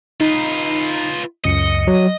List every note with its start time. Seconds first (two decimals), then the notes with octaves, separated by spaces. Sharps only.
0.20 D#4 F4 B4
1.45 C#2 F#2 D#5 C#7
1.87 F#3